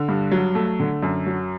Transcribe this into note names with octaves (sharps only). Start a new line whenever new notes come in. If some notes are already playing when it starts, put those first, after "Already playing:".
Already playing: D3
G2
F#3
A3
D3
F#2
F#3